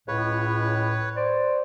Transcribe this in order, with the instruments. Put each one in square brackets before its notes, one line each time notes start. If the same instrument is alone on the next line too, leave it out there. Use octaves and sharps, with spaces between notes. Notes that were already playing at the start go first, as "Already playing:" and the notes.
[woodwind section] C#2 A2 [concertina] B4 C#5
[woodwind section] C5 D5